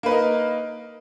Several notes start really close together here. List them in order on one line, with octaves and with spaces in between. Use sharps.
A#3 B4 A#4 D#4